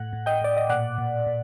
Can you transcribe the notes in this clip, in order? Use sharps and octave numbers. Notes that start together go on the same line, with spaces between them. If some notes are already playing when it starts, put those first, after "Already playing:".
Already playing: A2 F#5
A2
D#5 G5
A2 D5
D#5
A#2 D5 F#5
A#2
A#2